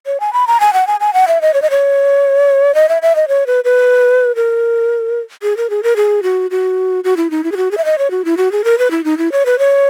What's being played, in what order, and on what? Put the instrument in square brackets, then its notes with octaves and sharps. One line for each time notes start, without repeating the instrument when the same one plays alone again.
[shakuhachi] C#5
G#5
B5
A#5
G#5
F#5
G#5
G#5
F#5
E5
D#5
C#5
D#5
C#5
D#5
E5
E5
D#5
C#5
B4
B4
A#4
G#4
A#4
G#4
A#4
G#4
F#4
F#4
F#4
E4
D#4
E4
G#4
F#4
G#4
E5
D#5
C#5
F#4
E4
F#4
G#4
A#4
B4
E4
D#4
E4
C#5
B4
C#5